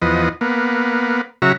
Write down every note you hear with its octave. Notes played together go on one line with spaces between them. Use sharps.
E2 F3 B3 D#5
A#3 B3
C#3 F#3 F#4 E5 A#5